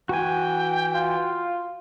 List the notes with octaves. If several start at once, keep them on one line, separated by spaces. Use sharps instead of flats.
E3 F#4 G5 G#5
F4